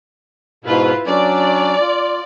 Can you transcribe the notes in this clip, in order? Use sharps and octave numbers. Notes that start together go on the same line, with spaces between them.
G#2 B2 E4 F4 B4
F#3 C#4 D4 D5
F4